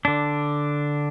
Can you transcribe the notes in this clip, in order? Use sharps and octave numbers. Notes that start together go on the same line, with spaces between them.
D3 D4